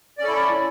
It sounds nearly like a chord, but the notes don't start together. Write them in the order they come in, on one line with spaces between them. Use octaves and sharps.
D5 C#4 A4 E4